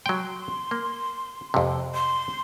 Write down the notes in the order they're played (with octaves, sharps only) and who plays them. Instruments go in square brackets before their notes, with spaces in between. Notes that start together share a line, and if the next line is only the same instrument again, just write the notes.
[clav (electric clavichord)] F#3 G5 [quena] C6
[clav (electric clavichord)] A#3
F2 C3
[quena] C6